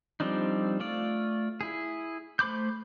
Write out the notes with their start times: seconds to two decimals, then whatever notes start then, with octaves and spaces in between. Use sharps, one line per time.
0.20 F3 G3 C4 D4 D#4
0.80 A3 F4 D5
1.61 E4 G#4
2.39 A3 C5 B5 D6 G6